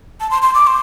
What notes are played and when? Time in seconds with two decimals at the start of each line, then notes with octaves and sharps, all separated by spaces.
0.20 A5
0.31 C6
0.42 C6
0.55 D6
0.67 C6